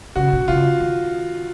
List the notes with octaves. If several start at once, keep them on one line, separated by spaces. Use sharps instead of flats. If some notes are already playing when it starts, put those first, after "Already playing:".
C#3 F#4
B2
C#3 F4
D#3